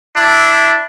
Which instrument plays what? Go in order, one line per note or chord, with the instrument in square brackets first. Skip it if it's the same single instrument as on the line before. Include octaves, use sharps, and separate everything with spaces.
[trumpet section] D4 E4